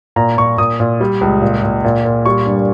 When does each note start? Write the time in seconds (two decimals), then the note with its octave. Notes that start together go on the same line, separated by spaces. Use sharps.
0.16 A#2 A#5
0.37 A#2 C#6
0.58 A#2 D#6
0.80 A#2
1.01 G3
1.21 C#2
1.42 A#2
1.63 A#2
1.84 A#2
2.05 A#2
2.26 G3 C#6
2.46 G2